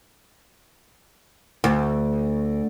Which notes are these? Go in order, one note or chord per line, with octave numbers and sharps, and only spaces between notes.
D2